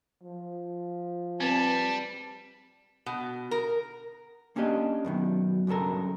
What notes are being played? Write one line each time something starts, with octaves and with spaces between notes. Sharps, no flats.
F3
G3 C4 B4 A5
B2
A#4
A#3 C#4 D4 G4 D#5
F#2 B2 D#3
B1 G2 C#3 A4 A#4